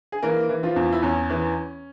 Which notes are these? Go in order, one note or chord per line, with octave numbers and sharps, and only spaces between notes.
G#4
E3 A#3 A#4
E3
F3 F4
E2
E4
E2 C#4
E3